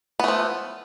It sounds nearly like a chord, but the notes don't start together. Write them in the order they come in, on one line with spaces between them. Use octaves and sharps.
B3 A3 F3